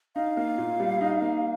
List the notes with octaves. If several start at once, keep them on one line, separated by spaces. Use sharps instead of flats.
D#4 F5
A#3
A#2
G3
D#4
A#3